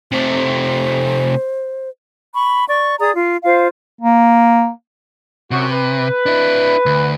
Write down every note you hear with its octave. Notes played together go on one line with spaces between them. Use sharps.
C3 A3 C5
B5 C#6
D5 C#6
G#4 D5 A#5 D#6
F4
F4 C5 F5
A#3
F#2 C3 F#4
B4
D4 E4
D2